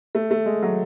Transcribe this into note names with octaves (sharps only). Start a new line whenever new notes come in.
A3
A3
G#3
F#3